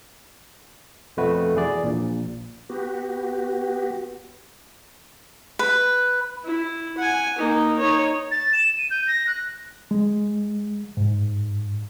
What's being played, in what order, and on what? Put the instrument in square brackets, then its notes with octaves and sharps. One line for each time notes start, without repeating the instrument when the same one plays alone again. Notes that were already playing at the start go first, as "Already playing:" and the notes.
[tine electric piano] F2 B2 A3 F#4 B4
E2 G#4 D5
A#1 A#2
[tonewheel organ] B3 F#4 G4
[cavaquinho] B4
[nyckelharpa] E4
F#5 G#5
A#3 D#4
D#4 C#5
[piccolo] A6
E7
D#7
G6
A#6
F#6
[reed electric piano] G#3
G#2